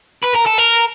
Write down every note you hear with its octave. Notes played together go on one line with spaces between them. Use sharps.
B4
A#4
A4
A#4